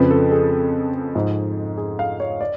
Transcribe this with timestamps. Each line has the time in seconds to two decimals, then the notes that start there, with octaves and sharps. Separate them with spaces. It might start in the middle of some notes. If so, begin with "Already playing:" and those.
Already playing: F2 C#3 F3 B4
0.11 A4
0.31 G#4
1.15 G#2 F3
1.77 G#4
1.99 F5
2.20 C#5
2.41 D5